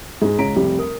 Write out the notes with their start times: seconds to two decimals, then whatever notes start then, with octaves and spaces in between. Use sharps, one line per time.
0.22 G#2 G#3
0.39 C#2 G#3 C#5 A#5 B6 D7
0.56 F1 C2 G3 G4
0.78 A#4 D#6